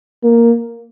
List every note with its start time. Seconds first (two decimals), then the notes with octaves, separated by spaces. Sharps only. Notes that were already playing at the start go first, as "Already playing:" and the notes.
0.24 A#3